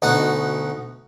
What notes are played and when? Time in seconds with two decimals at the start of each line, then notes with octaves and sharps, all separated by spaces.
0.02 D2 B2 D#4 F#5